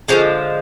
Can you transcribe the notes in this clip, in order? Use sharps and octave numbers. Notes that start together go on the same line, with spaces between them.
D3 F3 G#3 C#4